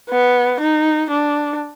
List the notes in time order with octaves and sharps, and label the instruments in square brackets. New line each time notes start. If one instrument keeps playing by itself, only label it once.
[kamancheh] B3
D#4
D4